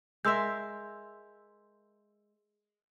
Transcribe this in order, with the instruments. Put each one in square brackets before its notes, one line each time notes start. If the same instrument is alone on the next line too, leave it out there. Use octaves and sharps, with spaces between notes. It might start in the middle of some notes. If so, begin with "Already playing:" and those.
[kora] G#3 A#4 E5 [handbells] C6 E6 G6